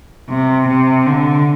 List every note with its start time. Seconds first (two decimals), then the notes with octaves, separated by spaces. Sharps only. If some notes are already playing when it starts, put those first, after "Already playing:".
0.29 C3
0.68 C3
1.06 D3